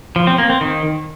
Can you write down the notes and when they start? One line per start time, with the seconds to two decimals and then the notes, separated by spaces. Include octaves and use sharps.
0.16 F3
0.27 C4
0.38 A#3
0.50 C4
0.61 D#3